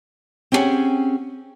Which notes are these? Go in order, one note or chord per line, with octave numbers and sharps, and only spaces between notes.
C4 C#4 E4 G4 G#4 F#5